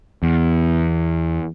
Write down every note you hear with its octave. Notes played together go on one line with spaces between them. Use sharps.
E2